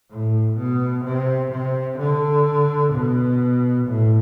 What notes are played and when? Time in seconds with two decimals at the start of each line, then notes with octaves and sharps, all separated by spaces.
0.10 A2
0.58 B2
1.05 C3
1.52 C3
1.99 D3
2.93 B2
3.87 A2